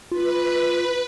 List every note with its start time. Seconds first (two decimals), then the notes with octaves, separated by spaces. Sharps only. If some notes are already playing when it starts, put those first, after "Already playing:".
0.12 F4 B4